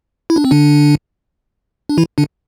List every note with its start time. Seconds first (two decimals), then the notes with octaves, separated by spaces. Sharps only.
0.30 E4
0.36 D4
0.45 C4
0.51 D3 D4
1.89 D4
1.98 E3 E4
2.18 D3 D4